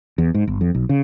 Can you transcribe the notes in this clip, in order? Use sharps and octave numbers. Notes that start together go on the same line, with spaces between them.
E2
G#2
G1
F2
B1
C#3